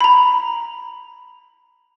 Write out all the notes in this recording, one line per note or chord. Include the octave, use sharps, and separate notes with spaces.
A#5 B5